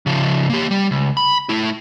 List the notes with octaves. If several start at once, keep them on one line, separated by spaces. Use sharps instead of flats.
C#3 F3
A#3 G4
G3
C#2
B5
A3 E4